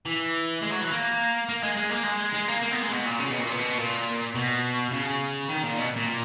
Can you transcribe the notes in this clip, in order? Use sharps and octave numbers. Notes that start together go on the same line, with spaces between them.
E3
G#3
F#3
E3
A#3
A#3
G#3
G#3
A#3
G#3
G#3
A#3
A#3
B3
G#3
B2
A#2
C#3
B2
A#2
B2
A#2
B2
C#3
D#3
A#2
B2
A#2